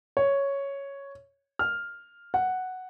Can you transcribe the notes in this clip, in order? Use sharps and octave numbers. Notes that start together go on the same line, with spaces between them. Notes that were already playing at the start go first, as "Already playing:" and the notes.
C#5
F6
F#5